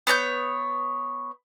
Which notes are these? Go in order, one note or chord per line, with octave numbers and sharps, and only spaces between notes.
B3 C#5 A5 G6